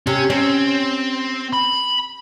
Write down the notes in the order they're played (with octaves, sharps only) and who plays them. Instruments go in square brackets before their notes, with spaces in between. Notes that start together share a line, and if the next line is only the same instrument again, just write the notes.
[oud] C3 [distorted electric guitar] C#4
[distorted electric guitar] C4 [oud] C#4
[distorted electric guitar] B5